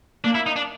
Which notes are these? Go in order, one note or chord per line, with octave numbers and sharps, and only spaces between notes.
A#3 D4
E4
D#4
D4